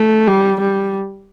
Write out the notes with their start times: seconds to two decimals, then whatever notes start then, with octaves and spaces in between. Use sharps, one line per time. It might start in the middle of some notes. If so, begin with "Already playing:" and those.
Already playing: A3
0.27 G3
0.60 G3